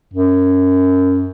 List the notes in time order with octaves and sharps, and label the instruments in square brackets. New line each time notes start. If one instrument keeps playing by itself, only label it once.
[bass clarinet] F#2